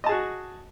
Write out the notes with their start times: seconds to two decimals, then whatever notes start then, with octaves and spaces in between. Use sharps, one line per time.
0.04 D#5
0.06 A5
0.09 G#4
0.11 F#4